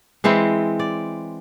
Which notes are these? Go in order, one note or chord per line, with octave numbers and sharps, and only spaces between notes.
E3 G#3 C4 E4
D5